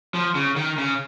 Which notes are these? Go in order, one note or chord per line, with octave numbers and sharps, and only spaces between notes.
F3
C#3
D#3
C#3